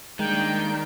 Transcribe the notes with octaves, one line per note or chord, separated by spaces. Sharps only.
D#3 G3 G#3 A#3 D4 G5